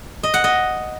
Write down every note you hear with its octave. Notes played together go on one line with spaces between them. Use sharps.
D#5
F#5
D#5